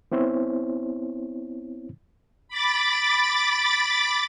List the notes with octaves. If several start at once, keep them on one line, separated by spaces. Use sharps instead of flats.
B3 C4 E4 C5 C#5
B5 D6 A6